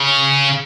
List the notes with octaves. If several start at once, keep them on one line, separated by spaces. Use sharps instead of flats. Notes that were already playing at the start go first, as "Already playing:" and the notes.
Already playing: C#3